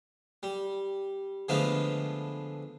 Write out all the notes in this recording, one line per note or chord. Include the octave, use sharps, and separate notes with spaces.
G3
D3 F3 G#3 A3 B3 F4